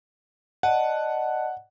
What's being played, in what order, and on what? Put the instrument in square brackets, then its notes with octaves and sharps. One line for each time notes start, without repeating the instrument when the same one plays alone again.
[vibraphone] D5 D#5 A5 [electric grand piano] F#5